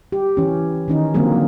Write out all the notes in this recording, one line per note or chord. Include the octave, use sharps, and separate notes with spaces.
G4
E3 C#4
D#3 C#4 D#4
D3 F3 F#3 A#3 C4 G#4